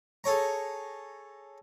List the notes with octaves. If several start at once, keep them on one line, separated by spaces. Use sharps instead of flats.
G#4 A4 C#5 A#5